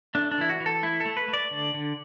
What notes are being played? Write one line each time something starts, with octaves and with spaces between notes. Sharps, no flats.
A3 D4
D4
E3 E4
F#4
E3
A4
A3 E4
A4
A3
B4
A3
D5
D3
D3